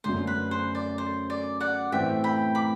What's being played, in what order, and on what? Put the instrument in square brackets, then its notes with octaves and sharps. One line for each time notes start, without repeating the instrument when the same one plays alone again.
[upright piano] F#2 D3 A3 [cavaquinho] C5
[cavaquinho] B4
C5
D5
C5
D5
D5 F#5
[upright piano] A2 E3 A3 C4 [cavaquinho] E5 G5
[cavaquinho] G5 B5
B5 D6